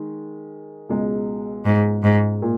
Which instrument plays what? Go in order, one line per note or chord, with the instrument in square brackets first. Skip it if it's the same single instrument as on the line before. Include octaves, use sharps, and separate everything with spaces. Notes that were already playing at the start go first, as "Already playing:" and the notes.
Already playing: [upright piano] D#3 G#3
C#2 B2 G#3
[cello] G#2
G#2
[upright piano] A#2